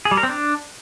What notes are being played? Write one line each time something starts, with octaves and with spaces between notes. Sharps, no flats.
G#4
G3
A#4
C4
D4